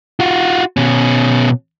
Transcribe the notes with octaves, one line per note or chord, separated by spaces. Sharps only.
F4 F#4
B2 C#4